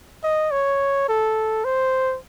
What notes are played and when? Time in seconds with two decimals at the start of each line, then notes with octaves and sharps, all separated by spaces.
0.23 D#5
0.51 C#5
1.08 A4
1.65 C5